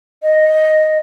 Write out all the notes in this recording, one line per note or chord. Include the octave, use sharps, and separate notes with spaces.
D#5